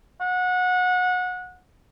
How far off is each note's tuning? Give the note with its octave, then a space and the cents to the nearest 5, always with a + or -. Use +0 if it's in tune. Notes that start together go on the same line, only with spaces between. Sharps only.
F#5 -25